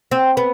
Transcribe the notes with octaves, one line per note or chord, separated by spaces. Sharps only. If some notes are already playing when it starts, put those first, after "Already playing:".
C4
B3